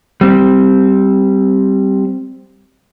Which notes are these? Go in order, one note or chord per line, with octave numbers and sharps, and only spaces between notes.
G3 C4